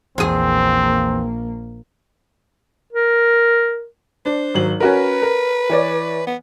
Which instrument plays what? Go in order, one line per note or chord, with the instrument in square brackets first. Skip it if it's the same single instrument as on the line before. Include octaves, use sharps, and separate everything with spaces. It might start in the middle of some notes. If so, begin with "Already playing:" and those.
[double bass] A#1 A#3 [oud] E2 G#4 [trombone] C4
[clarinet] A#4
[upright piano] D4 [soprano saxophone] C5
[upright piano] G#1 F#3 F#7
[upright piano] C#4 F#4 A#4 [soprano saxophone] B4
[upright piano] A#4
E3 C#5 D5
[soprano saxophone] B3